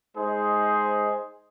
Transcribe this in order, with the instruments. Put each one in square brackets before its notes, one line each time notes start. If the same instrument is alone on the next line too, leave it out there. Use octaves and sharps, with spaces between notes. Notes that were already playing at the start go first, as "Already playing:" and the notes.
[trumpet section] G#3 D#4 G#4 C5 D#5